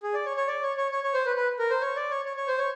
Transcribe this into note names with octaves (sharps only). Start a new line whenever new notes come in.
G#4
D5
C#5
C#5
D5
C#5
C#5
C#5
C#5
C5
B4
B4
A#4
C5
C#5
D5
C#5
C#5
C#5
C5
C#5